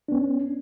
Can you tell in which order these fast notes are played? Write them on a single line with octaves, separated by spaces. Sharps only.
D4 B3 C#4